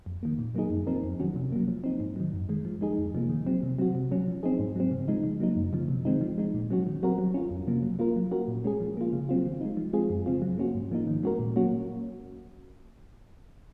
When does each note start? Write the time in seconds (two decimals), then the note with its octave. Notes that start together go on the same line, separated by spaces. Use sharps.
0.06 F2
0.23 D#3 A#3
0.39 A#2
0.55 F#3 A#3 D#4 G#4
0.70 F#2
0.87 F3 C4 D#4 A#4
1.04 F2
1.20 D#3 F#3 C#4 F#4
1.36 C3
1.52 F#3 A#3
1.68 F3
1.84 C4 D#4
2.00 G#2
2.16 D#3 F#3
2.33 F#2
2.49 D#3 G#3
2.65 F3
2.81 G#3 D#4 G#4
2.98 F2
3.14 C3 F3 A#3
3.29 D#3
3.46 F#3 C4
3.63 C3
3.78 F#3 C4 F#4
3.95 C3
4.11 F#3 C#4
4.27 F3
4.43 C4 D#4 G#4
4.59 G#2
4.76 F#3 C4
4.91 C#3
5.08 F3 G#3 D#4
5.24 C#3
5.40 F#3 A#3 D#4
5.56 F#2
5.73 C#3 F3
5.88 C3
6.05 D#3 G#3 C4 D#4
6.21 F3
6.38 G#3 D#4
6.54 A#2
6.70 F#3 C#4 F#4
6.87 D#3
7.03 F#3 C4 F#4 A#4
7.18 F#3
7.34 C#4 F4
7.50 F2
7.67 C3 F3 A#3
7.83 F#3
7.99 A#3 F4 A#4
8.16 F#3
8.31 C#4 F#4 A#4
8.48 A#2
8.64 G#3 C#4 G#4
8.80 F3
8.97 A#3 F4
9.13 C#3
9.29 F#3 C4 F4
9.46 D#3
9.61 G#3 D#4
9.77 F3
9.93 G#3 C4 F4 G#4
10.10 F#2
10.26 C#3 F3 C4 F4
10.42 F#3
10.58 A#3 C#4 F#4
10.75 G#2
10.91 F3 A#3 D#4
11.07 D#3
11.23 G#3 C#4 F#4 A#4
11.39 A#2
11.56 F#3 A#3 C#4 F#4